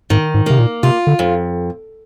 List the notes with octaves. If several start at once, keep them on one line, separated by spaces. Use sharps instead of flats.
G#2 D#3
G#2
C3 A#3
A#2
C3 F4
D3
F2